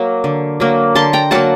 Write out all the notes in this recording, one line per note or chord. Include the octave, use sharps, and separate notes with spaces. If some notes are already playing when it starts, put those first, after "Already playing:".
Already playing: F#3 A#3
D3
F#3 A#3
D3 A5 C6
G5 A#5
F#3 A#3 F#5 A5